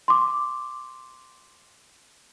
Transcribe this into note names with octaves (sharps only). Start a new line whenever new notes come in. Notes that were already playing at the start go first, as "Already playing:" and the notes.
C6 D6